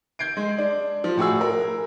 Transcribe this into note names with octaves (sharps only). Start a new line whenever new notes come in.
G6 G#6 C7 D7
G#3
D4
F3
A2 F#4 G#4 E6
A#4